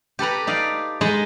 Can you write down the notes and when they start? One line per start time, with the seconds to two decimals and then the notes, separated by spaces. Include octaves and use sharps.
0.19 G4 A4 B4 A#5
0.47 D#4 D5 F5
1.01 G#3 D#4 D#5 A5 B5